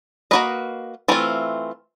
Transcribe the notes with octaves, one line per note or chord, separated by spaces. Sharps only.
A#3 C#4 F#4 B4 D#5
E3 A3 C4 F4